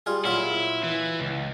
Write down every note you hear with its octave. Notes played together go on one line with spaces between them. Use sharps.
G3 F4 G#4
A#2 F#3 E4 F4
E3
C#2